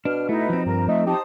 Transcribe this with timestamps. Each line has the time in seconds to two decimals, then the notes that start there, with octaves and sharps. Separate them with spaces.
0.05 B2 D4 F6
0.29 A3 D#4 E4 B4
0.49 F3 C4
0.66 G2 A#4 A#5
0.88 A3 D#4 E5
1.07 D#4 G4 C5 A5 D#6